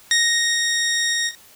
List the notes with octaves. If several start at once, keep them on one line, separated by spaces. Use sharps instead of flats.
A#6